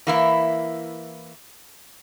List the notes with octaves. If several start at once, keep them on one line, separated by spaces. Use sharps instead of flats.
E3 A#3 E4